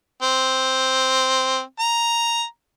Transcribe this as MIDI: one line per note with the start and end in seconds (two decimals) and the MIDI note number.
0.23 1.61 60
1.80 2.44 82